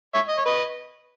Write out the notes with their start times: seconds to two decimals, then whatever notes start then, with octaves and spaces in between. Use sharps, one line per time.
0.14 C#5 E5
0.29 D#5
0.38 C#5
0.45 B4 D#5